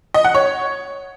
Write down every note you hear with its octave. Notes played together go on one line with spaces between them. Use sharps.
D#5
F#5
C#5